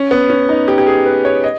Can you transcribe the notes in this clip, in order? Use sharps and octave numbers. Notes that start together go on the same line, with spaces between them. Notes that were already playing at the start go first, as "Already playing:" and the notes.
Already playing: C#4
B3
C#4
D#4
G4
G4
G#4
B4
C#5
D#5